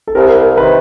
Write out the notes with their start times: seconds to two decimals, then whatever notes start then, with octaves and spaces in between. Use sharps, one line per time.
0.07 A4
0.15 C2 A#4
0.57 C3 D#3 B4